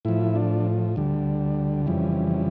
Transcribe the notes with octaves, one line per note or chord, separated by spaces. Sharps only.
A2 F3 E4
D4
D2 D3 G3
F2 C#3 E3 G3